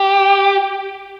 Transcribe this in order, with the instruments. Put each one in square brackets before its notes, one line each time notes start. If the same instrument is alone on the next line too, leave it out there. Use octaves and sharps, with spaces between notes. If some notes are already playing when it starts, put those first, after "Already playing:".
Already playing: [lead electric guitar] G4